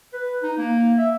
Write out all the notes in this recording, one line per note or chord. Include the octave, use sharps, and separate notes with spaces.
B4
D#4
A#3
E5